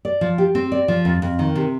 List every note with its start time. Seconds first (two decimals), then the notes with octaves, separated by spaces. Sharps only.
0.05 D5
0.21 F3
0.38 G4
0.55 C4
0.72 D5
0.88 F3
1.05 F2
1.22 F2
1.39 D#3
1.55 C3